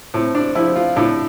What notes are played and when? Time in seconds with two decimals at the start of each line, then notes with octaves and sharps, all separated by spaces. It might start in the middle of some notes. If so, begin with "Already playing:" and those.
0.14 A2 C4
0.35 D4
0.55 F3 E4
0.76 F4
0.97 A2 D4